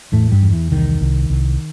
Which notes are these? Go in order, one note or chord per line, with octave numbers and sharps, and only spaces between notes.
E2 A2 A3
G2 G3
E2
E3
C2 D#3
C2
C2